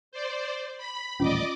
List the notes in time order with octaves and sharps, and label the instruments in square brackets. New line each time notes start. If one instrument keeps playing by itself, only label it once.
[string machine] C5 D5
B5
[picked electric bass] D#1 A1 [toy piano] C#4 F4 [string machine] D5 D#5 D6